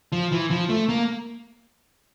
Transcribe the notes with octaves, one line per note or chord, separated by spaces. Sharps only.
F3
E3
F3
A3
A#3